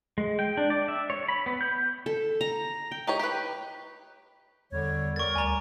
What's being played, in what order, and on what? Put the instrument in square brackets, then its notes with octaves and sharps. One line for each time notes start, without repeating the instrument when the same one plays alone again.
[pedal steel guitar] G#3
G5
D4
D5
E5
C#5
B5
B3
G6
[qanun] A4
A#5
G5
[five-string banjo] D#4 G4 C#5
G4 B4
[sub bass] E2 [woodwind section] D3 G3 C#5
[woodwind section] G3 A#4 D5 [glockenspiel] C#6 A6
[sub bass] D2 [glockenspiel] G#5 A#5